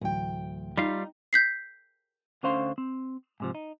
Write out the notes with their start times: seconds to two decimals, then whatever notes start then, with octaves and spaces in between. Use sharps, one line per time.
0.01 D2 A2 E3 F#3 G5
0.77 G3 D#4 F4 F5
1.33 G6 B6 C7
2.43 D2 D3 C#4 C5 F5 C6
2.78 C4
3.40 G#2 C3 F3
3.55 D#4